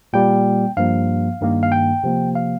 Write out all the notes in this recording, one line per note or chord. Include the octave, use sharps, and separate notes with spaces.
A#2 G3 A#3 G5
G2 F3 A#3 F5
G2 D#3 A#3
F5
G5
C3 F3 A#3
F5